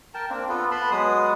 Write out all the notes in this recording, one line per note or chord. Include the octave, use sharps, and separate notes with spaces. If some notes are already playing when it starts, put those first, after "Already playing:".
A#4 G5 A5
A#3 C4 D4
B3 F4 A4
B3 A5 B5 C6
F#3 G#3 B3 D#6